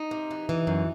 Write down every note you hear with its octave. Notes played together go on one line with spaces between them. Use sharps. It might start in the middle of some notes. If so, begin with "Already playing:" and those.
Already playing: D#4
C3
E3
E3
F#2